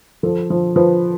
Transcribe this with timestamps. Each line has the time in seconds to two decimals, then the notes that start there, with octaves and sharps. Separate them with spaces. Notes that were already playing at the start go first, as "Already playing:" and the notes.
0.23 F3 A4
0.50 F3
0.76 F3 B4